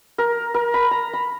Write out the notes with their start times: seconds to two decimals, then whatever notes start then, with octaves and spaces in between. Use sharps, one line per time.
0.18 A#4
0.54 A#4
0.74 B5
0.91 A#5
1.13 B5